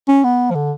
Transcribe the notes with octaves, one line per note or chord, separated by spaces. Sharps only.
C#4
B3
F3
D3